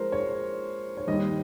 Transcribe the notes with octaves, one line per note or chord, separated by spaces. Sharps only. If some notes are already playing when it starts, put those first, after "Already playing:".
Already playing: F3 G#3 A#4 C5
C#5
C#5
D#2 D#3 G3 D#5